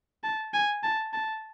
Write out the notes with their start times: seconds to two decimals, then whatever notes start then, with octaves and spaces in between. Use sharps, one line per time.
0.24 A5
0.54 G#5
0.83 A5
1.13 A5